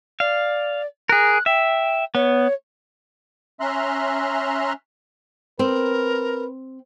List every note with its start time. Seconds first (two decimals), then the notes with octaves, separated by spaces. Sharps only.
0.20 D5 F5
1.09 G#4 A#4 F#6
1.46 E5 G5
2.15 B3 C#5
3.60 C#4 E5 A#5 C6 F6 F#6
5.59 C4 A#4 B4